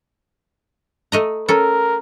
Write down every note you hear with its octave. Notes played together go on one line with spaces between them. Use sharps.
A3 D#5 A#5
C#4 A4 A#4